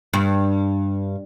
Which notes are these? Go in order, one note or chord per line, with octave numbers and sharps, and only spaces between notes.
G2